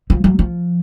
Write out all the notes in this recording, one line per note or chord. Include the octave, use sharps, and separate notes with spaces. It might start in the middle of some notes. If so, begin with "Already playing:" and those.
F3
F#3
F3